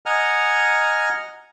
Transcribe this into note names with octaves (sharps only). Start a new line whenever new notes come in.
D#5 F#5 G#5 A#5 F6